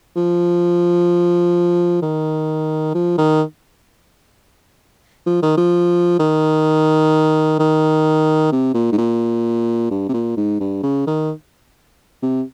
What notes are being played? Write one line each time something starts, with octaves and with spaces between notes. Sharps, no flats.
F3
D#3
F3
D#3
F3
D#3
F3
D#3
D#3
C3
A#2
G#2
A#2
G2
C3
A#2
G#2
G2
C#3
D#3
C3